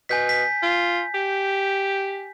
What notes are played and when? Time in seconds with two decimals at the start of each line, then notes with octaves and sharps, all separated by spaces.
0.09 B2 G#5 G6 B6
0.29 B6
0.62 F4
1.14 G4